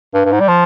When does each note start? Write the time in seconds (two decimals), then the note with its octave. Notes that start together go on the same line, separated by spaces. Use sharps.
0.14 G2
0.25 G2
0.32 G#2
0.40 G3
0.48 F3